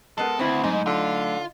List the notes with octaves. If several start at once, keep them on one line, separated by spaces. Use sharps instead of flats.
G#3 B3 A4 A#4
D2 B3 C4 E4
G#2 F#3 A3 D#4
D3 F4